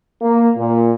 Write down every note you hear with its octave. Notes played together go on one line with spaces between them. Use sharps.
A#3
A#2